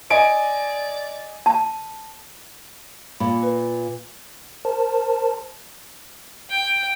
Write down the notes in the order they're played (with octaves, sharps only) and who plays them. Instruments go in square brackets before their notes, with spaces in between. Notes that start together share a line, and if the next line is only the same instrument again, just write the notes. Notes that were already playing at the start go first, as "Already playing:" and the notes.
[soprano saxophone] D5 [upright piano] D#5 G#5 D7
[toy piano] A5
[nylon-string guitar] A#2 [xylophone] B5
[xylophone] B4
[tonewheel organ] A#4 C5 A5
[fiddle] G5